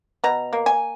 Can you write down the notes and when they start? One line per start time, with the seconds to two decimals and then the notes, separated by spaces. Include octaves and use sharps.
0.24 B2 A#5
0.53 A#3
0.66 G#5